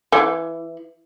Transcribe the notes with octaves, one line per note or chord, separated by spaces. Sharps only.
E3